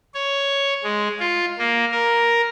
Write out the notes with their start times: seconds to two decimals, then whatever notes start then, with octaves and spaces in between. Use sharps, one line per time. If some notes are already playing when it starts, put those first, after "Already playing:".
0.14 C#5
0.84 G#3
1.20 F4
1.58 A#3
1.92 A#4